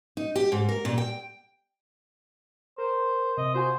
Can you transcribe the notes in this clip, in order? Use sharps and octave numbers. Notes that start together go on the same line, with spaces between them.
D#4
G4
G#2
A#4
A#2
G5
A#4 C5
C3 D#5
F4 F#4 C5 G#5